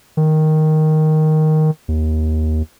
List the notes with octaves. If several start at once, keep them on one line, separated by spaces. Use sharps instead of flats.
D#3
D#2